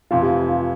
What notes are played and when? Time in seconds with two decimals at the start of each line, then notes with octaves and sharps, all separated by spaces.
0.11 F1 F2 C3 E3 F4
0.23 G4
0.30 F4
0.49 F4